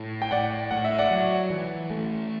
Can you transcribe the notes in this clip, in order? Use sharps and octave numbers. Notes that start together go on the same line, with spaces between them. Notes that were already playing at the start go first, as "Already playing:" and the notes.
Already playing: A2
G5
A2 D5 F#5
A2 F#5
E5
D5 F#5
F#3
E3
A3